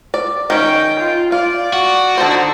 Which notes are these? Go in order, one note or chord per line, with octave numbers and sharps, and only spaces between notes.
D5
D#3 C#4 G5
F4
F4 D5
F#4
D3 D#4 C5 A5